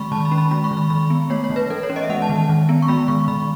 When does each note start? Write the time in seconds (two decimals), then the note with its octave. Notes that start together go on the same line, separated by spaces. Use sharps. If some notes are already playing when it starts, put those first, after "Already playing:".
Already playing: D#3 G#3 B5 C#6
0.12 D#3 A5
0.25 B5
0.32 C#4
0.38 B5
0.51 G#3 B5
0.64 C#6
0.71 D#3
0.77 B5
0.90 D#3 B5
1.10 B3
1.30 A3 C#5
1.44 C#5
1.50 E3
1.56 B4
1.70 E3 A4
1.83 C#5
1.90 C#4
1.96 D#5
2.03 E5
2.09 G#3 F#5
2.22 A5
2.29 D#3
2.36 A5
2.49 D#3
2.69 B3
2.82 C#6
2.88 G#3 B5
3.08 D#3 C#6
3.28 D#3 B5